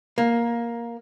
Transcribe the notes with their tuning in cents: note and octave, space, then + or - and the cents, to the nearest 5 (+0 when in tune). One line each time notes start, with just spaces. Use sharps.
A#3 +10